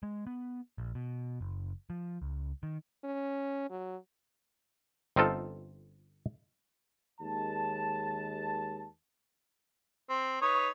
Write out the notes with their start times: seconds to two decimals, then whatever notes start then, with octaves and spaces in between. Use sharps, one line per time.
0.03 G#3
0.27 B3
0.78 A#1
0.95 B2
1.41 F#1
1.90 F3
2.22 C#2
2.63 D#3
3.04 C#4
3.70 F#3
5.16 G1 C4 D#4 F4 A4
7.21 D#2 G#3 A5
10.10 C4
10.42 D#4 B4 C#5